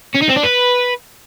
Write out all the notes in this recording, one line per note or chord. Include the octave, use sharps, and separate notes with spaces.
C#4
D#4
C4
D4
B4